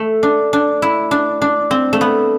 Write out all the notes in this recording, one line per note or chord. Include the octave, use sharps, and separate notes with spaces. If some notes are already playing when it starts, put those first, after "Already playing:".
Already playing: A3
D4
D4
E4
D4
D4
C4
A3
B3